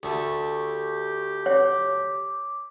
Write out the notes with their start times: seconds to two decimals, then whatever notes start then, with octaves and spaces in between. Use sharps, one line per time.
0.03 D2 A3 G4
1.46 C#5 D6